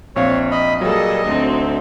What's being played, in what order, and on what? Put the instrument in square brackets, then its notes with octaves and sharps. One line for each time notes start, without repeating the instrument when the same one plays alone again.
[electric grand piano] A#1 C4 F5 [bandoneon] C#5
[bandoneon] D#5 B5
[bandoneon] A#2 G3 [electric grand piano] F#3 [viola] G#4 A4 [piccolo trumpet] D#5
[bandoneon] D2 [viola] C4 D#4